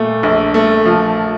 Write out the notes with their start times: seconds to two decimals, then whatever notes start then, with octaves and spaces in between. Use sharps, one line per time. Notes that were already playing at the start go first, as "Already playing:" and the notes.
Already playing: A#2 A3
0.23 A#1
0.54 A3
0.85 F3